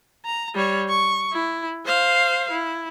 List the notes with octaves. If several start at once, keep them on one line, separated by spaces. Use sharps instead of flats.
A#5
G3 C#5
C#6
E4
C5 F5
E4